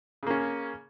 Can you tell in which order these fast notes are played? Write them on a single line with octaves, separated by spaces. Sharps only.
C#3 A#3 C#4